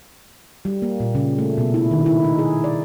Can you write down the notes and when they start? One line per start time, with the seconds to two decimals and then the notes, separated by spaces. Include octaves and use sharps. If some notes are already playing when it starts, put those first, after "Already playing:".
0.65 G3
0.82 A#3
1.00 A#2
1.15 C#3
1.38 A3
1.58 B2
1.74 E4
1.91 D#3
2.06 E4
2.24 D#4
2.39 G#4
2.64 D5